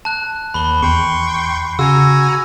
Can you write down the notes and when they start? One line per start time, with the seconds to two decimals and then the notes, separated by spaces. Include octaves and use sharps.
0.05 A5 F#6
0.54 D#2 B5 G7
0.82 E2 G5 C6 C#6
1.79 C#3 F#4 G#5 A#5 E6